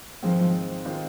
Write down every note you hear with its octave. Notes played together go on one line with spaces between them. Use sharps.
G#2 D#3 F3 G#3 C4 F4
D#3 G#3 C4 F4